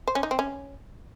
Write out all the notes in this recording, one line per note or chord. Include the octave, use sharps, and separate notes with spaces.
C5
C#4
D#4
C4
C#4